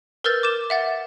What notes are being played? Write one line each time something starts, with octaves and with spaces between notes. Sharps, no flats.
A#4 B4 E6 F6 G6 A6
D6 G6 E7
E5 F#5 A6